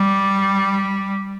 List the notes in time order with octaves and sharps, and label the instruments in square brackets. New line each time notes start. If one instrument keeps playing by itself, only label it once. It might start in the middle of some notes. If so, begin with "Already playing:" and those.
Already playing: [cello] G3